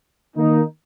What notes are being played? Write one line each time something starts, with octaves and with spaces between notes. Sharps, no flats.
D#3 A#3 D#4